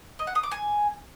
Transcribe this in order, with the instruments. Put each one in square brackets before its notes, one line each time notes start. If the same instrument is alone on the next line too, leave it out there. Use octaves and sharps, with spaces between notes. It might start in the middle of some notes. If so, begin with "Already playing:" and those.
[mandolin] D#5
F#5
D#6
D6
G#5